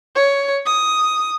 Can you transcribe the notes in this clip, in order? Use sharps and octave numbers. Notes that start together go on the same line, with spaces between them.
C#5
D#6